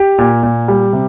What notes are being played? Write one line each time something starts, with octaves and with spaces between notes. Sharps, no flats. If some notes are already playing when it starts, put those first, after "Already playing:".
Already playing: G4
A#2
A#2
G3
C3